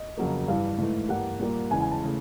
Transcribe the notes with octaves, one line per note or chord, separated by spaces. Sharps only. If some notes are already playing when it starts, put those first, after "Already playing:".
Already playing: D#5
F2 C#3 F#3 A#3
G2 E3 G3 F5
G#2 E3 A3
G2 E3 G3 A#3 F#5
A#2 G3 A#3
E2 C#3 E3 G#3 G#5
G#5
A5
C#3 E3 A3